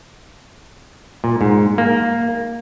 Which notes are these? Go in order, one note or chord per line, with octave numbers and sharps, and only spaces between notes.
A#2
G#2
A#3